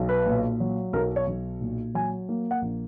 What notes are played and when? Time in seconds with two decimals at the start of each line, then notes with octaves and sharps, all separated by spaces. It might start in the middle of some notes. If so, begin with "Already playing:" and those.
Already playing: B1
0.09 B4
0.26 A#2
0.60 F#3
0.93 B1 A#4
1.16 C#5
1.27 B1
1.61 A#2
1.95 F#3 G#5
2.29 A#3
2.51 F#5
2.62 A#1